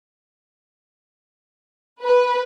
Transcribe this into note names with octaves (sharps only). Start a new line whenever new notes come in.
B4